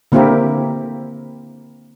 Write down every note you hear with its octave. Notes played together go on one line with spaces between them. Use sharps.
D3 A#3 C4 E4 G4 A#4